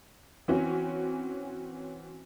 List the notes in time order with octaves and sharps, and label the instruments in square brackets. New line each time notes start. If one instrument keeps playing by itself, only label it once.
[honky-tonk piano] E3 C4 C#4 F#4